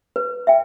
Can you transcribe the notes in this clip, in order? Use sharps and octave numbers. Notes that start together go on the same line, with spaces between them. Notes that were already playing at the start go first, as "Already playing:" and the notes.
B4
E5 G5